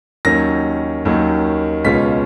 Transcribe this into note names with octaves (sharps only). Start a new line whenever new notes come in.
D#2 D#3 F#3 C#4 A#6
D#2 D#3 F#3 C#4
C#2 B2 G#3 C#4 F4 B6